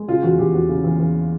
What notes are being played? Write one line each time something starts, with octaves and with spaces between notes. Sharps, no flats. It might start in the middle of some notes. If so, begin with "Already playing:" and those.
Already playing: G#3
C#3 F4
E2 F#4
E2 G4
E2 F#4
C#3
E2
E2